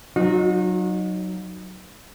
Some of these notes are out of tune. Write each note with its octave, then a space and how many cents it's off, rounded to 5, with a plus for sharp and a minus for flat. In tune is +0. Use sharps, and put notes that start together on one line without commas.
F#3 +5 D#4 -15 F#4 -40